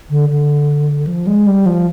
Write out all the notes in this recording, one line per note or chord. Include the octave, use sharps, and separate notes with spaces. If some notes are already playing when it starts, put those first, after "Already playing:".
D3
D3
F3
G#3
G3
F3